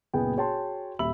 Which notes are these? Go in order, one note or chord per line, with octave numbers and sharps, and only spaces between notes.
F#1 A#2 B3 E4 G#4 G5
F#4 G#4 C#5 G5 A5 C6
D#1 E5 B5 E6 F#7